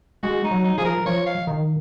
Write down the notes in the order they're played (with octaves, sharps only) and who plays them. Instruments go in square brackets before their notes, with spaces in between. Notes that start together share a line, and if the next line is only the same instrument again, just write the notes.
[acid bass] G#3 [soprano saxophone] F#4
[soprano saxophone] D#4
[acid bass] F#3
[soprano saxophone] D#4
[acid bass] F3 [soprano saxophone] G#4
[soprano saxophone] A#4
[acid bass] F3 [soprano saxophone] C#5
[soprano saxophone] F5
[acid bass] D#3